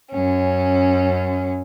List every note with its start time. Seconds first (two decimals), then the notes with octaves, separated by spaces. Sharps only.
0.11 F#2 C#4